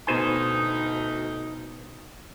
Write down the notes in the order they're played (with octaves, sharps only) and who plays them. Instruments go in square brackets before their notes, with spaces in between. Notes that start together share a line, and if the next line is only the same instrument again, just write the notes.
[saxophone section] D2 D#4 [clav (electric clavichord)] B2 C5 G#5